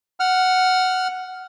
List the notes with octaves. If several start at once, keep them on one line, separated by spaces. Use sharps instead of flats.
F#5 F6